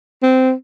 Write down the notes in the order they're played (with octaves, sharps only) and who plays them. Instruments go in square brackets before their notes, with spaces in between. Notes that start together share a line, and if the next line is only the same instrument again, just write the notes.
[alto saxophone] C4